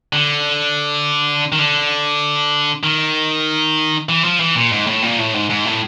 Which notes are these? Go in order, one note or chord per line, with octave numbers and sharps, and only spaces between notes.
D3
D#3
D3
D#3
E3
F3
E3
A#2
G#2
A2
A#2
A2
G#2
G#2
A2